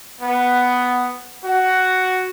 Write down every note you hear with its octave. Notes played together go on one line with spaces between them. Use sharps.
B3
F#4